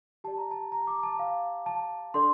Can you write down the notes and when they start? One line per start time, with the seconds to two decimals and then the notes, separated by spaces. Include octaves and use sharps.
0.24 G4 D5 A5
0.38 A#5
0.51 A5
0.72 A#5
0.87 D6
1.03 A5
1.19 F5
1.66 A5
2.14 D4 A4 D5 C6